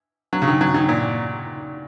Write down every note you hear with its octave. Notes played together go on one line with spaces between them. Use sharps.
F#3
C#3
D#3
F#3
D#3
A#2